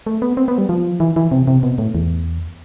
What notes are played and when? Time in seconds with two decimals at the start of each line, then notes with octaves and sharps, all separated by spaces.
0.07 A3
0.22 B3
0.37 C4
0.48 B3
0.58 G3
0.69 F3
1.00 E3
1.16 E3
1.31 C3
1.48 C3
1.63 B2
1.78 A2
1.95 E2